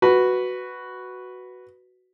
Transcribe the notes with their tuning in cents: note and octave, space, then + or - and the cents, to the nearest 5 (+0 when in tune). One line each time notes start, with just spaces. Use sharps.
F#4 +0 B4 +0